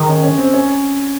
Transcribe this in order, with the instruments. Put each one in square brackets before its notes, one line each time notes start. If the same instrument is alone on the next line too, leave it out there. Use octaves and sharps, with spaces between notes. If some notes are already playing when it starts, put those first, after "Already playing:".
Already playing: [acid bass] D#3 [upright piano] G#3
[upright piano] C#4
C#4
C4
C#4